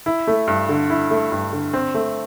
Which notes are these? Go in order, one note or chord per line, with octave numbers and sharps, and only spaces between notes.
E4
A3
G2
D3
E4
A3
G2
D3
C4
A3